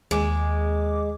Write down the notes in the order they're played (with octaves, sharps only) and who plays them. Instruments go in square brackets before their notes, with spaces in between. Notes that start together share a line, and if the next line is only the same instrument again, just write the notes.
[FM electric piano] D#2 D6 [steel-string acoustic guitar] G#3